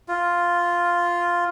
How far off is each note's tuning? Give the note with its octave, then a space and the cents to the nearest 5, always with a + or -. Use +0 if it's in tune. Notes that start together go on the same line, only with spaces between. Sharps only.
F4 +0